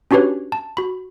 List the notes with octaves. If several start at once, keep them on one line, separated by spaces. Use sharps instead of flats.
C#4 D4 F#4 G4 B4 C#5
A5
F#4 B5